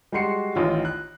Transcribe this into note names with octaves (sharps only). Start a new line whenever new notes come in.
G3 G#3 F#4 C6 C7 C#7
A1 D#3 F4
F#6